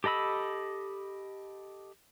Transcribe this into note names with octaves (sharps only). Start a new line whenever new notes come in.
G4 A4 D#5 B5 E6